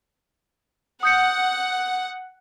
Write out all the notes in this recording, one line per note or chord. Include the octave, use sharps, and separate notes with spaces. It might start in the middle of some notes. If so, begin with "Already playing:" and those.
F#5 D#6 G6 C#7